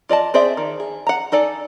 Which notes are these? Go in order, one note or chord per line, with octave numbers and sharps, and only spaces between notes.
F4 D5 D#5 A5
C4 G#4 C5 D5 E5
D#3
G#4
F#5 A#5
D#4 A4 D5 G#5